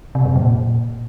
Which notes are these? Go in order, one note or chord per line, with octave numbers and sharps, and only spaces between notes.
C3
F#2
A#2